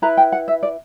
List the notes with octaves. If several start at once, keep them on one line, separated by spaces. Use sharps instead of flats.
E4 B4 A#5
G5
F#5
E5
D5